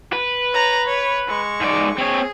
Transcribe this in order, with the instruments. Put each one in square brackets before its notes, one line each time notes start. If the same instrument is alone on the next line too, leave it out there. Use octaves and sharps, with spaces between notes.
[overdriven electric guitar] B4
[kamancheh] C#5 A#5
C#5
G#3 C#6
[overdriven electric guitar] G#2 D5
[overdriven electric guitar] C4 C#5 [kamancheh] G#4